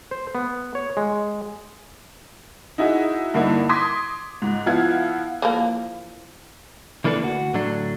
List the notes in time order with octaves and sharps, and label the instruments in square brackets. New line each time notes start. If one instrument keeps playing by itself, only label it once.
[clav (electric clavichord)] C5
B3
C#5
G#3
[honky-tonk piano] D#4 E4 F#4 G#4 E5
G2 D3 A#3 D#4 E4
C6 D6 D#6 G#6 A#6 B6
C#2 G#2
F3 B3 E4 F5 F#5 G#6
[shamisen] E3 F3 A#3
[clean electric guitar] C3 E3 A#3 D4 A4 B4
D2 F#4
A2 D3 F#3 D4